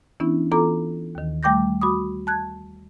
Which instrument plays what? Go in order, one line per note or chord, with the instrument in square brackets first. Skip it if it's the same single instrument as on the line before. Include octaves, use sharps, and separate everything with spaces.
[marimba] E3 B3 C#4 D4 E4
E3 B3 F4 A4 A#5 D6
D#2 D#3
G3 A3 G5 D6 G6 A#6
F#4 B5 D6 D#6
A5 F#6 G#6